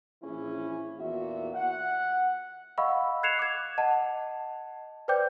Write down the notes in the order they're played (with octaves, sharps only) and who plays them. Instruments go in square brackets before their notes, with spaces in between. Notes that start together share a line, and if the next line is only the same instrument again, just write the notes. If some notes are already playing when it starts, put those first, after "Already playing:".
[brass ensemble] A#1 E3 C#4 E4 G#4
E2 A#2 F#4 E5
F#5
[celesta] D#5 F5 F#5 B5 C#6 E6
F#6 G#6 C7 C#7 E7 F7
D6 G#6
D#5 F#5 A5
B4 C5 D5 G5 D6 G6